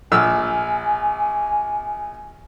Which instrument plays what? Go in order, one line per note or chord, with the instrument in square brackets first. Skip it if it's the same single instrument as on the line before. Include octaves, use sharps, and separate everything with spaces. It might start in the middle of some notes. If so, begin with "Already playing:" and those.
[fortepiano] A#1 E6 F6 [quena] G#5